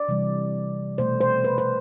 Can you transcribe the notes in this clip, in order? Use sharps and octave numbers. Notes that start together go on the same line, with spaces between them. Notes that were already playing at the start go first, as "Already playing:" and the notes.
Already playing: D5
C3 E3 G3
B2 A3 C5
C5
B4
C5